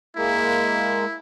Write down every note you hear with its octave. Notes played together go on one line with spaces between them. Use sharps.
G#3 A#3 E4